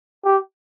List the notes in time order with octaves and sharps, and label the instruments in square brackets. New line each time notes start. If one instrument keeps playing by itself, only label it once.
[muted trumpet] G4